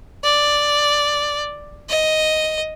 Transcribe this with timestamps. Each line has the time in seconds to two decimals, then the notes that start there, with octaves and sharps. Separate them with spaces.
0.24 D5
1.89 D#5